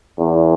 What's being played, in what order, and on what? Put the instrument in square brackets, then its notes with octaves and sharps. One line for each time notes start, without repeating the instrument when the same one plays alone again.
[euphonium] E2